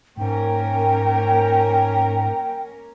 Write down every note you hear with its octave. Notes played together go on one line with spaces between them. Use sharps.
G#2 A#3 C#4 A#4 G5